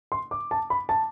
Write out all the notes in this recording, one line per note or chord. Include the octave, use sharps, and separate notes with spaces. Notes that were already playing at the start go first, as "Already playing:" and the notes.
C6
D6
A5
B5
A5